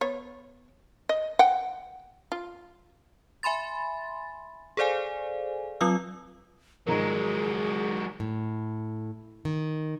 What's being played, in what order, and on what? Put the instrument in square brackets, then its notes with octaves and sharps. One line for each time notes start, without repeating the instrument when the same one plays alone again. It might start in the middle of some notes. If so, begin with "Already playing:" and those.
[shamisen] B3 C#5
D#5
F#5 G5
F4
[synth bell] E5 G#5 B5 C6 A6
G#4 A4 C5 D5 F5 G#5
F#3 C4 F4 D#6 E6
[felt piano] G#2 D#3 F3 [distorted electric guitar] F#3 G#3 [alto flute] G#4 [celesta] A#4 A#5
[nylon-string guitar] A2
D#3